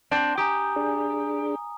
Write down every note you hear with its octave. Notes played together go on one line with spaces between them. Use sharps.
C4 D4 D5
G4 G#5 A#5 D#6
D4 G#4